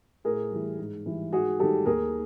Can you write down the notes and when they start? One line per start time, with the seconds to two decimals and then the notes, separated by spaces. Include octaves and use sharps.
0.24 A2 G#4 A#4
0.51 E3 G3
0.79 G#2
1.06 E3 G3
1.32 G#2 F#4 G#4
1.59 D#3 G3 G4 A4
1.86 D#2 G#4 A#4